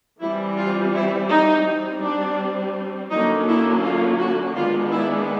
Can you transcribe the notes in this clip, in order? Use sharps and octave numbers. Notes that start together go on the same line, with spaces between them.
E3 G3 C4 E4
F4
E4
D#4
G3 C4
D4
D3 F#3 A#3 C#4 D#4
E4
F4
F#4
D#3 G#3 B3 D4 F4
E4